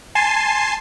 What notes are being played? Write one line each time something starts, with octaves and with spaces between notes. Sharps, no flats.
G#5 A5 C6 C7